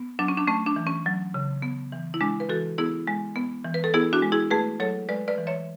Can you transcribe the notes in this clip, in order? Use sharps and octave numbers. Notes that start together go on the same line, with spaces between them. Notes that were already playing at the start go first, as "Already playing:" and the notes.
Already playing: B3
F#3 D4
C#4
D4
A3 C#4
D4
E3
C#4
F#3
C#3
B3
E3
E4
G#3 D4
B4
E3 F#4 A4
B3 E4 G#4
G#3
B3
E3
B4
A4
B3 E4 G#4
D4 F#4
G#3
E4 G#4
A3 G#4 B4
F#3 A4 C#5
G#3 B4 D5
B4 D5
E3
C#5 E5